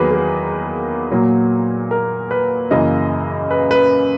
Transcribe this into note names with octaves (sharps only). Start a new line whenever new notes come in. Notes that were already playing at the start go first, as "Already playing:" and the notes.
Already playing: E2 D#3 F#3 A#3 G#4 B4
G#4
A#2 F#3 A#3
A#4
B4
F#2 C#3 E3 A#3 D#5
B4
B4